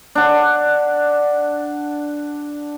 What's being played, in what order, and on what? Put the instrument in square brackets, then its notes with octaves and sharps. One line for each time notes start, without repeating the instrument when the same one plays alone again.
[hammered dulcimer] D4 F#5